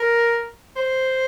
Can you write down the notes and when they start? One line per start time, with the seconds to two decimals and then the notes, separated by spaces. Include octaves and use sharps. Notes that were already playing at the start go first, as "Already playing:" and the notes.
Already playing: A#4
0.76 C5